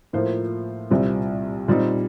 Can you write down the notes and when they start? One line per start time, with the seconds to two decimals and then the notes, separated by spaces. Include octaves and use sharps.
0.13 A2 F3 A#3 F4 C5
0.90 C2 A#2 G3 C4
1.68 A#2 G3 C4 D#4